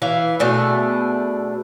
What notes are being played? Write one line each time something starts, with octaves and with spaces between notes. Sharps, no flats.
E3 E5 F5
B2 A3 D4 G#4